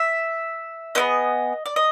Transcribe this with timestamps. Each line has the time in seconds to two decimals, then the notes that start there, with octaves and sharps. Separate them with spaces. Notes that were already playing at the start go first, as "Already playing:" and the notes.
Already playing: E5
0.95 B3 E4 G#4 D#5
1.66 D5
1.76 D#5